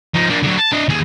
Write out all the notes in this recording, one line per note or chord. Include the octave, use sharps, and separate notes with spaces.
F3 D#4
A#3 D4
D3 F#3
A5
D4 D#5
D#2 G#4